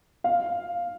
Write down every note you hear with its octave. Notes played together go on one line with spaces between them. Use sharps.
F5